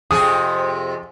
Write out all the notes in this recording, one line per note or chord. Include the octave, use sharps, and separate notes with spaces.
F2 C3 G#4 D#6